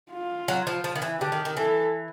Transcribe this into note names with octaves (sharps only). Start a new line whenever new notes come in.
F4
F#3
F3
F3
D#3
E3
D3 G4
D#3
D#3
E3 A4